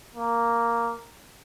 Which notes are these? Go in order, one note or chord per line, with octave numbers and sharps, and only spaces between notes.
A#3